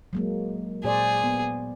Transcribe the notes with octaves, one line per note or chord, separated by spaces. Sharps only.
F#3 G#3 A#3
A#2 G#4 C5 D5
B3